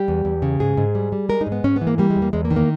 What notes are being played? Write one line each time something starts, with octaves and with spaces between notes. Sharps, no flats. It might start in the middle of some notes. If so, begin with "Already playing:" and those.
Already playing: G3 G4
E2
E2
C#3
G#2 G#4
G#2
G3
G3
G#3 A#4
D#4
G#2
B3
G#2 C#4
B3
E3
A#3
G3 A#3
G#3
E2
A#3
E2 G#3
A#3
D#3
A#3